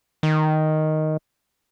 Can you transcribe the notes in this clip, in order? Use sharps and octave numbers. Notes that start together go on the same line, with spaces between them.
D#3